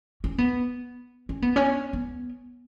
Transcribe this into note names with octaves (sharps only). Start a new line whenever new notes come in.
C#4
B3
C#4
B3
C#4
B3